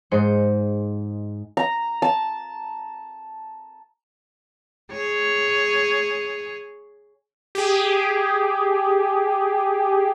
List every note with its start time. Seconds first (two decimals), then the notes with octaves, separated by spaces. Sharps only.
0.11 G#2 G#3 C5 C#7
1.57 A#5
2.02 A5
4.91 G#4 C#5
7.55 G4 G#4